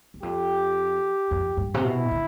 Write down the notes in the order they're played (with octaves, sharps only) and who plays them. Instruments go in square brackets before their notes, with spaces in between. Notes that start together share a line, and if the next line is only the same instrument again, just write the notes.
[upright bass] E2
[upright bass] F2 [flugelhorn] G4
[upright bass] F2
G2
C3
[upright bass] B2 [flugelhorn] E4
[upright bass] D3